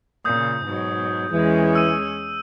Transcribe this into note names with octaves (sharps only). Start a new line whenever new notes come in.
A#2 C#3 D#6 G6
G#2 B2 F#3
E2 E3 G#3 C#4
E6 D#7